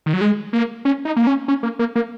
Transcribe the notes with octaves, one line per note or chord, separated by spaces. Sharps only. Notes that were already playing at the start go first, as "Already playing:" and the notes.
D#3
F#3
G#3
A#3
C#4
D#4
A#3
C#4
C#4
A#3
A#3
A#3